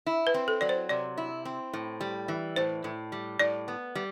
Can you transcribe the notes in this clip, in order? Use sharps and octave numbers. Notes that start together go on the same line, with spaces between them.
E4
B4
C4
A4
F#3 D5
C5
C3 D5
E4
C4
A2
G3
E3
A2 C5
A2
G3
A2 D5
B3
G3